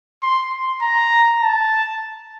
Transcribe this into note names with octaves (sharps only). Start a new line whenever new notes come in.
C6
C6
A#5
A5